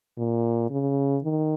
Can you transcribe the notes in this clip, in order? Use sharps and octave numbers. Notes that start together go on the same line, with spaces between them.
A#2
C#3
D#3